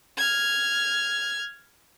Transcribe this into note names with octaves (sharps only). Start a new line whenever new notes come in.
F6 G#6